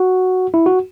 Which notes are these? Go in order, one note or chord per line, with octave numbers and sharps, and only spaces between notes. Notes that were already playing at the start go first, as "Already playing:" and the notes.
Already playing: F#4
E4
F#4